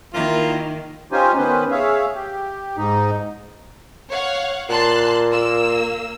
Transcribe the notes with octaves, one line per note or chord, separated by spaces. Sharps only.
D#3 A#3 E4 F4
C#4 D#4 F4 G4 C5 G#5
D#3 B3 C#4 B4 C5
G#4 C#5 E5 F5
G4
G#2 D#4
C#5 F5 F#5
A#2 A5 C6 F#6
A#3 E6